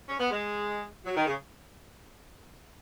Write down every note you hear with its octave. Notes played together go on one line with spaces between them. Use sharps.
C#4
B3
G#3
F#3
D#3
C#3